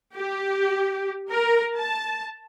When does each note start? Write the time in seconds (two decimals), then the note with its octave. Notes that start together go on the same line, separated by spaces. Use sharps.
0.15 G4
1.31 A#4
1.77 A5